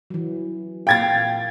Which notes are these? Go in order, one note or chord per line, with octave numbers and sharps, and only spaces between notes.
E3 F#3
A#2 F5 G5 G#6 A6